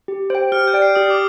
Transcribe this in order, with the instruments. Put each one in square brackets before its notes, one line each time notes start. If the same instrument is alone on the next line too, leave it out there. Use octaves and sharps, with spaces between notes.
[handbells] G4
C5 G5
[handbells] G4 [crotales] F6
[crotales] G6
[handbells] D5 G5
[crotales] C7
[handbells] G4 [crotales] D#6
[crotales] D6